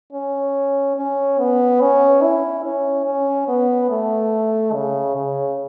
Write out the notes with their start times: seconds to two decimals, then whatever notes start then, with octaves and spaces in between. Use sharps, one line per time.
0.13 C#4
0.97 C#4
1.39 B3
1.81 C#4
2.23 E4
2.64 C#4
3.06 C#4
3.48 B3
3.90 A3
4.74 C#3
5.15 C#3